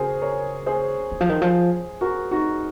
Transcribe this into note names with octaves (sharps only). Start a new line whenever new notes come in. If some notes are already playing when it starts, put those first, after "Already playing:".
Already playing: C#3 F#4 G#4 A#4 C5
A#4 C#5
G#4 C5
D#3
F3
D#3
F3
F#4 A#4
D#4 F#4